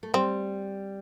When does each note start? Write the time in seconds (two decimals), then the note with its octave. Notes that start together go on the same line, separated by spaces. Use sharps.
0.03 A3
0.14 G3 C4